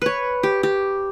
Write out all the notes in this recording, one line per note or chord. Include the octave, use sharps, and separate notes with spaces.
B4 C#5
G4
G4